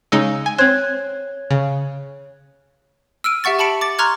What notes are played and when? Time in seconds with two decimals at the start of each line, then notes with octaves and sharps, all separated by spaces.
0.12 C#3 G#3 D#4 E6
0.46 G#5
0.58 C4 C5 C#5 F#6 G#6
1.51 C#3
3.24 E6 F6 D7 D#7
3.44 G4 E5 F#5 C#6 A6
3.59 G4 A5 B5 C#7 D7
3.81 D6 A6
3.99 A#5 C6 C#6 F6 F#6 G#6